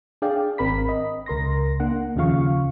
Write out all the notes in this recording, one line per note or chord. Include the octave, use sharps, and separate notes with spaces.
D4 G#4 D5 F5 G5
G#1 C4 A#4 B5 B6
D#5
C#2 A#4 C6 A#6
A#3 D4 F#5
D#2 C#3 F3 F4 F5 C#6